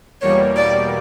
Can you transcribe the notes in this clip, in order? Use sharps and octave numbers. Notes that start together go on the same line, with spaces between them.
E2 B2 G3 A#3 C#5
D5